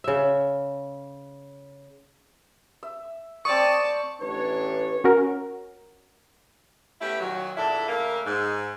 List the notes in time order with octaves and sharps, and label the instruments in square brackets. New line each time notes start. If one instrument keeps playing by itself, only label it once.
[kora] C#3 E5
[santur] E5
[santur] C4 D#6 [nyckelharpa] D5 A5 [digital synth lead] C#6
[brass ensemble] A1 D4 C#5 [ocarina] B4
[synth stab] C#4 F#4 A#4
[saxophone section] A3 B3 C#4 E4 G4
A#2 D#3 F#3
E2 A#2 D4 E4 A4
C#3 A3 A#3
G#2